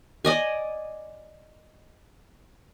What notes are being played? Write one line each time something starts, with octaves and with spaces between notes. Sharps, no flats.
D5 D#5 G#5